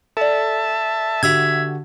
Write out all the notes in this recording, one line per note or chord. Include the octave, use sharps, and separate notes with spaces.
A4 D5 E5 A5
D3 F#4 G4 E5 E6 G#6